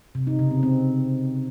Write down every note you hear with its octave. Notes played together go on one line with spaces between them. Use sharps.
C3
D#4
C#3
C4
C4